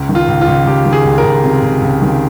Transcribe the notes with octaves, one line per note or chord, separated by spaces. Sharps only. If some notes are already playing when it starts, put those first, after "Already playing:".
Already playing: C#2
D#3
F4
C#2
F4
C#2
C#2 G4
D#3
G#4
C#2
A#4
C#2
C3
C#2
C#2
D#3